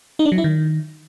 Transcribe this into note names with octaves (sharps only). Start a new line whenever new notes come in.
D#4
D4
F#3
E4
D#3